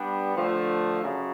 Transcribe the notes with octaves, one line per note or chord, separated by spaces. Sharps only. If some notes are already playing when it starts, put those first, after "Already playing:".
Already playing: G3 B3 D4 G4 B4
D3 F3 A3
F#2 C#3